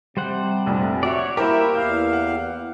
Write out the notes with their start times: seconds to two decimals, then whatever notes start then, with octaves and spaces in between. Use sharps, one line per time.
0.17 C3 G3 C5 F#5
0.66 F1 A#1 F2
1.03 F#4 C#5 D5 E5
1.37 A#3 E4 G4 A#4 C5 E5
1.75 E2 F5 F6 G6
2.13 F#5